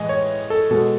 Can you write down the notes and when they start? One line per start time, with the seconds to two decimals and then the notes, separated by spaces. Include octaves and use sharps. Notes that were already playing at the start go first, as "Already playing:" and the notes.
Already playing: A2 E3 G#3 D#5 G#5
0.09 C#5
0.50 A4
0.71 B2 G#3 A4